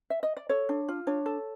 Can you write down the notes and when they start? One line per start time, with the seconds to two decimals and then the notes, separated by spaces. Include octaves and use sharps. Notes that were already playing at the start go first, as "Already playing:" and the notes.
0.10 E5
0.23 D#5
0.37 D5
0.49 A4 C#5
0.69 D4
0.88 F4
1.07 D4 C#5
1.26 A4